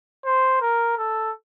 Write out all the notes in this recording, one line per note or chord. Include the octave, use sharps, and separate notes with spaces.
C5
A#4
A4